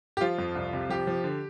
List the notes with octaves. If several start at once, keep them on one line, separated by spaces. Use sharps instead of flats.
G4
F3 F4
F2
C2
C3
F3 G4
F3
D3